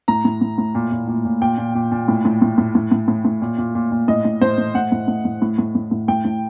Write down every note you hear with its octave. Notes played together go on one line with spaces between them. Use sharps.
A2 A#5
A2
A2
A2
A#2
A#2
A#2
A#2
A#2 G5
A#2
A#2
A#2
A2
A2
A2
A2
A2
A2
A2
A2
A#2
A#2
A#2
A#2
A2 D#5
A2
A2 C5
A2
A2 F#5
A2
A2
A2
A2
A2
A2
A2
A2 G5
A2